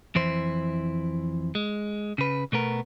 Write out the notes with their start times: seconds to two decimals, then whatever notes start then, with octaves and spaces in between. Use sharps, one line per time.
0.15 F2 E3 E4 C5
1.55 G#3
2.18 C#3 B4
2.52 B2 A3 B3 A#4